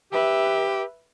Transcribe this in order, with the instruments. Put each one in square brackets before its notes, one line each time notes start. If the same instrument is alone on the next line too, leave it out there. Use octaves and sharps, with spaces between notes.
[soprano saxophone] G4 [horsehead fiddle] B4 E5